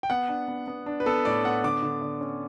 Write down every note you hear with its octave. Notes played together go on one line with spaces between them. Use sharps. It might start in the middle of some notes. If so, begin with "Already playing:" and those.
G5
B3 F#5
D4
B3
B3
D4
B4
B3 A4
A2 D5
B3 F#5
D3 D6
D3
D3
C#4